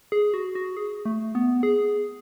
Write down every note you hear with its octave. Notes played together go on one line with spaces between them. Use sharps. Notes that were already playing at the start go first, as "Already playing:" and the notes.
G#4
F#4
F#4
G#4
A3
B3
G#4